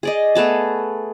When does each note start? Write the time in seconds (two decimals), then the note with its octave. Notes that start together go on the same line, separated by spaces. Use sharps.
0.03 G#4 D5 D#5
0.35 A3 B3 G#4 A5